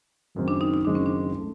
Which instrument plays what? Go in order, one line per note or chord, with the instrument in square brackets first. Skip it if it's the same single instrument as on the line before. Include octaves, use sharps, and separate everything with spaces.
[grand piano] F#1 F#2 D#3 G#3 C4
[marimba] D4
D#4
D#4
[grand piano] F#1 F#2 D#3 G#3 C4 [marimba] D4
[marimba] C#4
D4
[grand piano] A3